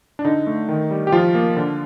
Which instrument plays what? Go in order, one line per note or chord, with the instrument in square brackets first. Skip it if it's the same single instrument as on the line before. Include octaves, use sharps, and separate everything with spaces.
[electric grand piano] D4
D3 D#4
A3
D#3
G3
G4
F3 F4
A#3
D3